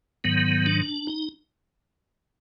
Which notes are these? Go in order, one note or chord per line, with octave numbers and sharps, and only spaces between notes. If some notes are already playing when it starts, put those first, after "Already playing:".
G#2 D#3 F#3 B3
D4
D#4